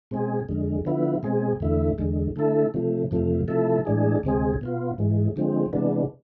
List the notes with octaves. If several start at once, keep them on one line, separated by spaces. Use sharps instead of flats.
B2 G#3 C4 G#4
F2 D3 G#3
D3 F3 B3 E4
B2 G#3 C4 G#4
E2 D3 A3 E4
E2 D3 G#3
D3 A3 E4 A4
C3 F3 A3
F2 C3 F3 A3
C3 F3 A3 E4 A4
A2 E3 G#3 D4 G#4
D2 C3 G#3 C4 G#4
B2 B3 F4
G#2 E3 G#3
D3 F3 G#3 C4
C3 E3 G#3 B3 D4